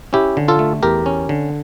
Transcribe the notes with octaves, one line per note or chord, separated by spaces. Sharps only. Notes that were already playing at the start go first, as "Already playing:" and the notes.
C#4 E4 G4
D3
F4 A4
A3
E2 G4 A#4
C#4
D3